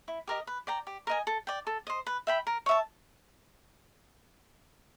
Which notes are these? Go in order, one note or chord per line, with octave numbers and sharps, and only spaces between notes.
E4
G4 A#4 D#5
B4
D5 G5 A#5
G4
A#4 D#5 G#5
A4
D5 G5
A4
C5 D#5
B4
E5 G5 B5
A#4
C#5 E5 A5